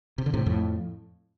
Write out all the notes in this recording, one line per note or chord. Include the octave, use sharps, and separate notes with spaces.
C3
D3
A2 C3
F2 A2